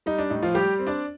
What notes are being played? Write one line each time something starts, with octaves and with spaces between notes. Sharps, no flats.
G3 D#4
D4
A2 D#4
F3 F4
G3 G4
C4
D4 D5